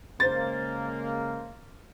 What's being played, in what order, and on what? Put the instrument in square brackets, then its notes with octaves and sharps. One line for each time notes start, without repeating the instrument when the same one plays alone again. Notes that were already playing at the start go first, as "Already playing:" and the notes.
[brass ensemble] C#3 G#3 A#3 [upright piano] C5 A6